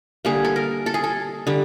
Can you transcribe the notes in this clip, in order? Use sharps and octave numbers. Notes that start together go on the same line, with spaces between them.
D3 G3 A#3 G#4
A4
A#4
A4
G#4
A4
D3 G3